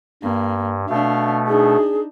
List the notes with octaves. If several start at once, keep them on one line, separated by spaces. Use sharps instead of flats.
G2 A#3
B2 A3 D4 F5
D4 D#4 G#4